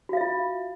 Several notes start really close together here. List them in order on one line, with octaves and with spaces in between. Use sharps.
F#4 F5 E5 F4